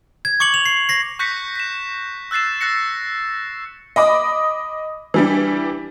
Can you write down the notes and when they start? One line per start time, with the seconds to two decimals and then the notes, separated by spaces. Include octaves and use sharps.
0.25 G#6
0.40 C#6 D6 C#7 F#7
0.54 F7
0.66 C7
0.89 A#6 C7
1.19 C#6 F#6 G6 A#6 B6 C#7
1.56 B6 E7
2.31 E6 F#6 A6 C7 E7
2.61 F#6 A6 A#6 C#7
3.96 D#5 B5 D6 D#6
5.14 E3 G3 D4